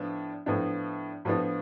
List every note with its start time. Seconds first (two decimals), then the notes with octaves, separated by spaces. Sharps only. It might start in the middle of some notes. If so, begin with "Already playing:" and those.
Already playing: A2 F3 B3 D4
0.46 A2 F3 B3 D4
1.25 A2 F3 B3 D4